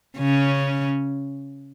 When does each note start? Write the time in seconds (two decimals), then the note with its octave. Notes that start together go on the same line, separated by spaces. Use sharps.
0.18 C#3 C#4